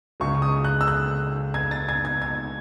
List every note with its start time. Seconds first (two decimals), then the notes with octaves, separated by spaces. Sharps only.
0.20 C#2 C#3 G#3 C#6
0.42 D#6
0.65 F#6
0.81 E6
0.88 F#6
1.54 G#6
1.71 A6
1.89 G#6
2.05 G#6
2.22 G#6